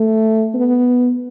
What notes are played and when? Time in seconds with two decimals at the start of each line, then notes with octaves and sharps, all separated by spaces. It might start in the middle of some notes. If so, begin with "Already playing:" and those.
Already playing: A3
0.54 B3